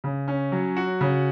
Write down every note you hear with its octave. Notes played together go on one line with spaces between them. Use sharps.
C#3
C#4
F#3
F#4
C#3